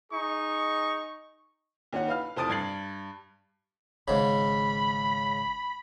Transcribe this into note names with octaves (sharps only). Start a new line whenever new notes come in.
D#4 G#4 C#6
D#2 C#4 D#4 F#5
B4 F5 F6
F1 C5 A5 D#6 A6 D7
G2 G#6 A6 C7 F#7
G#1 G#2 C#3 B5